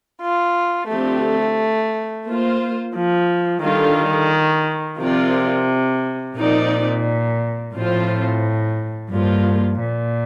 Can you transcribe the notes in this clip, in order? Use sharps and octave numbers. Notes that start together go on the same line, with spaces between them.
F4
D3 F3 A3 C4 G4
A#3 F4 C5
F3
D3 D#3 G3 D4 F4 A4
C3 F3 C4 F4 A#4 D5
A#2 F3 C4 D#4 A#4 D5
A2 F3 C4 F4 C5
G2 F3 A#3 F4
A#2